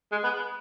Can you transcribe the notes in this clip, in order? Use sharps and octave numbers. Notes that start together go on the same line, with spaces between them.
G#3
B3